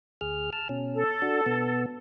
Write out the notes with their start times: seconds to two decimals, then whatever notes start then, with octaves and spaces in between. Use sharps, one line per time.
0.21 D2 G#4 F6
0.53 A5 F6
0.69 B2 C#4
0.95 A4
1.22 D4 F#4
1.46 B2 B3